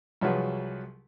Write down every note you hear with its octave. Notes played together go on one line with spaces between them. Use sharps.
C2 F3 F#3 F#4 G#4 B4